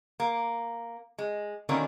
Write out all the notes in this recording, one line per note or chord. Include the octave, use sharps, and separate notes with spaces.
A#3
G#3
B2 D3 D#3 A#3 C#4